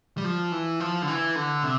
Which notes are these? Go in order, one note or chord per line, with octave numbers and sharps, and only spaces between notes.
G3
F3
E3
F3
D3
E3
D3
C3